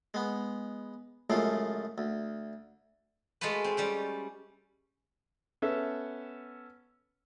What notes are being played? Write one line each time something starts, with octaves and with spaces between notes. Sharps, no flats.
G#3 B3
F#2 C#3 F3 G#3 A3 F4
D2
G#3 A3 F4 F#4 B4
C4
G3 C#4 G4
B3 C#4 A4 E5